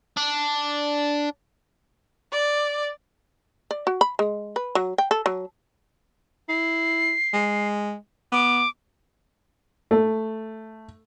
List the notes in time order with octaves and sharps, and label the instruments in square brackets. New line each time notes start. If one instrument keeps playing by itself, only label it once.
[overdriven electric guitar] D4
[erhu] D5
[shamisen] D5
F#4
B5
G#3
B4
F#3
G5
A4
F#3
[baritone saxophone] E4 [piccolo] C7
[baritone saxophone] G#3
[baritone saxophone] B3 [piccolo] D6
[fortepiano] A3